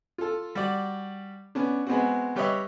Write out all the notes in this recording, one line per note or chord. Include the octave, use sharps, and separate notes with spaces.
F4 A4
G3 F#4 D5
B3 C#4 D4
G#3 B3 C4 F#4
G3 G4 B4 C#5 D#5 E5